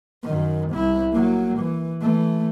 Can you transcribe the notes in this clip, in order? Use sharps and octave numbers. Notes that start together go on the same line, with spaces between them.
F#2 D#3
C2 E4
F#3 A#3
E3
E3 A3